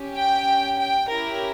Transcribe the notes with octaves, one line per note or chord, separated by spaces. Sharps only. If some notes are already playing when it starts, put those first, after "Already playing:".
Already playing: C#4 G4
G5
G5
C#4 E4 G4 A#4